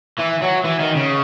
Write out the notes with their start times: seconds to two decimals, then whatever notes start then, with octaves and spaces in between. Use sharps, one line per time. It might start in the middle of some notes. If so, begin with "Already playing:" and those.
0.18 E3
0.41 F#3
0.64 E3
0.79 D#3
0.96 C#3